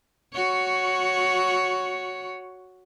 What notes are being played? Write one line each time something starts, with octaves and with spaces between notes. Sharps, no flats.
F#4 C#5